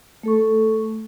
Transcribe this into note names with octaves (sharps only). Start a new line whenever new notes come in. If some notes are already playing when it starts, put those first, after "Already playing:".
A3 A4 C#6